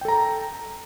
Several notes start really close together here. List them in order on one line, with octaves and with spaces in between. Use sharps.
G5 A4 A#5